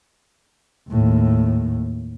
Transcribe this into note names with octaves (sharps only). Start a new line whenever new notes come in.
D#2 A2